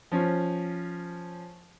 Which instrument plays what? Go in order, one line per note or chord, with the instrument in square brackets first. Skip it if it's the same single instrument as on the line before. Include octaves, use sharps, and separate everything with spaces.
[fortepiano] F3 C#4